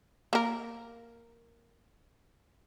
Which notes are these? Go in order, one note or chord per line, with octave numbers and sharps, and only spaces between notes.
A#3 A#4